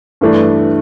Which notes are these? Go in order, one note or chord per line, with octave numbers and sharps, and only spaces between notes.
G2 E3 A3 D4